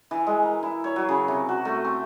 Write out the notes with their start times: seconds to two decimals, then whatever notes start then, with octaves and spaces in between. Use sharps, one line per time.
0.11 E3
0.27 G#3
0.43 A#4
0.63 E4
0.84 C#5
0.96 F#3
1.09 C#3
1.28 C3
1.49 F#4
1.65 A3
1.84 C4